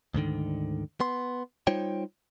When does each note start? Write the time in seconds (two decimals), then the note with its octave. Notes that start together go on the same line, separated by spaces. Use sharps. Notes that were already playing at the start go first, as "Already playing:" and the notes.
0.14 D2 G#2 D3 D#3
1.00 B3 C6
1.67 G3 D#4 F4 C5 C#5 G5